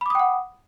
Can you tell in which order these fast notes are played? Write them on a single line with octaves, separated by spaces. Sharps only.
B5 D6 D#6 G5 F#5